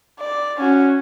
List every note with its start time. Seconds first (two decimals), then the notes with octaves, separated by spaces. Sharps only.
0.20 D5
0.58 C#4 F#4